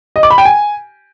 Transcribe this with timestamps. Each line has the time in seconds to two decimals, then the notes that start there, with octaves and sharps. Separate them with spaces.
0.16 D#5
0.23 D6
0.31 B5
0.38 G5
0.45 G#5